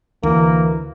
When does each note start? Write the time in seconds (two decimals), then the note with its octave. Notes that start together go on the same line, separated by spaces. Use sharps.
0.23 D2 E3 A#3